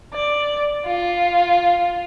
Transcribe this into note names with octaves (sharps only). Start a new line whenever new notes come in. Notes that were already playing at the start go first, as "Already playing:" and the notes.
D5
F4